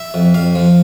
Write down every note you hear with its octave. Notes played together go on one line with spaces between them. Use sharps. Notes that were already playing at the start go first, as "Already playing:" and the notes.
Already playing: E5
F2
F2 F5
F3